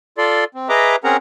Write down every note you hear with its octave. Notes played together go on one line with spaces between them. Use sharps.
F4 A4 D5 C6
C4
G#4 B4 D#5 E5 A#5 D6
C4 C#4 G#4 A#4 F#5 A#5